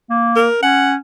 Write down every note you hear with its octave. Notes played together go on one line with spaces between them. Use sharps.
A#3
A#4
C#4 F#5